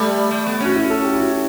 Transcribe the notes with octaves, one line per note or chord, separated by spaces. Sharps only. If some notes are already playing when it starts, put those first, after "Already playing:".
Already playing: G3 A3
A3
B3
C#4 F#4
E4
A4
G4
E4
F#4